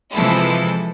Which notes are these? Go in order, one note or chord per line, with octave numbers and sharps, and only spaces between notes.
C3 E3 F3 G#3 E4 A4